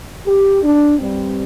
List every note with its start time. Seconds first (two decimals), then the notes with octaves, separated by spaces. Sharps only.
0.27 G4
0.63 D4
0.99 G2 G3 C4